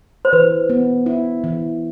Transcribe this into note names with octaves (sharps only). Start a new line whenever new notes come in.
C5
E3 B4
B3
E4
E3